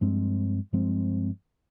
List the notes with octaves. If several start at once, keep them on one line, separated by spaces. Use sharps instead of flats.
G2 F3 G#3 C4
G2 F3 G#3 C4